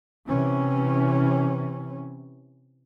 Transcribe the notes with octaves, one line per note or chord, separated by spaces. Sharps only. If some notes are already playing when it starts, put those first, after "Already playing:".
C3 E3 C#4